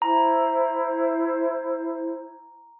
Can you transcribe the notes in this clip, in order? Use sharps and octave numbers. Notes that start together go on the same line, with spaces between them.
E4 C5 A#5